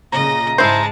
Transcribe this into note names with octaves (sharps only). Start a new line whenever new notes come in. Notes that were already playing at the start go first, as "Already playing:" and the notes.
A#2 C#3 D#5 A#5
G#2 G#3 E4 C5 A5